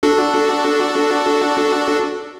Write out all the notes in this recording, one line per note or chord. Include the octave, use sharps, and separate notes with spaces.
D4 F#4 A4